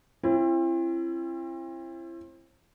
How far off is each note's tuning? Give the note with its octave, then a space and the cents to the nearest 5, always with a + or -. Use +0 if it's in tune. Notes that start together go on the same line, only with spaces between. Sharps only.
C4 +35 E4 +35